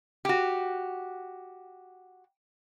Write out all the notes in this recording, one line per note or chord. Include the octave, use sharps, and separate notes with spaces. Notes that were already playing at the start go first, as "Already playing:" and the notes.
F#4 G4